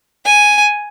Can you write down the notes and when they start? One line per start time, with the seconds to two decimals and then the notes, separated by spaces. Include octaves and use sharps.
0.26 G#5